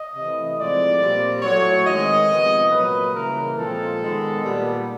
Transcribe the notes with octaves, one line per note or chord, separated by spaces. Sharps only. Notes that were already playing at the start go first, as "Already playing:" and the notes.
Already playing: D#5
C3 E3 A3
A2 F3 G#3 C4 D5
A#2 G3 C4
A2 F#3 A3 C#5
D#3 G#3 C4 D#5
C3 F3 G#3 B3
A#2 F#3 A#3 B4
C#3 E3 G3 A#3 A#4
A#2 F3 G#3 C4 A4
D#3 G#3 B3
A#2 G3 B3